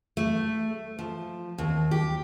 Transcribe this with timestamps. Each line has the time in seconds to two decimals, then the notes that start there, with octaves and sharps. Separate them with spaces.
0.17 A3
0.99 F3
1.58 D#2
1.91 G4